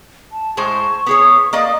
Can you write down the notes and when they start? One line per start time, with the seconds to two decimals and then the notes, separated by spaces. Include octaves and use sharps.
0.32 A5
0.57 A2 G#3 C5 C#6
1.06 B3 G#4 C#5
1.53 A#3 D5 D#5 F5